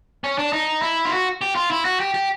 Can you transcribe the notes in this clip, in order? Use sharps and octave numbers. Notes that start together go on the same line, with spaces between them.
C#4
D4
D#4
E4
F4
F#4
G4
F4
E4
F#4
G4
G4